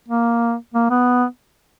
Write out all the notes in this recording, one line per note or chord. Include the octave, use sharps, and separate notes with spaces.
A#3
A#3
B3